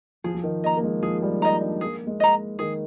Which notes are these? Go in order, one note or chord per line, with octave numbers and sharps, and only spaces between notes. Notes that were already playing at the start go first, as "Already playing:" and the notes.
F3 G#4
F3
D#3
A#3 D#5 A#5
A#3
G#3
F3 G#4
G3
D#4 D#5 A#5
D4
A#3 G#4
G#3
D#5 A#5
D#3 G#4